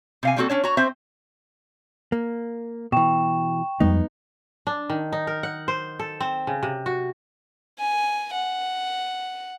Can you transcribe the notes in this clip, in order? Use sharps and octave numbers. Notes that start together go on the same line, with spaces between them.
C3 F5 G#5
G3 A#3 C4 F#4 G#4 A4
C#4 D4 C#5
F#4 C#5 A#5
C4 C5 E5
A#3
B2 E3 G5 C#6 E7
F2 G3 G#3 B3 D#4
D4
D#3
D#4
A#4
F#5
C5
A4
C4
C#3
C3
F#4
G#5
F#5